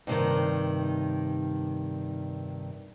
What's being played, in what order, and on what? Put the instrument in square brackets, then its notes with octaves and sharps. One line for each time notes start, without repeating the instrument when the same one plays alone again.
[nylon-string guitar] G2 C3 D#3